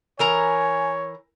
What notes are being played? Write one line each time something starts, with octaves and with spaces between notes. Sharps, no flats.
E3 A#4 C#5 G#5 A#5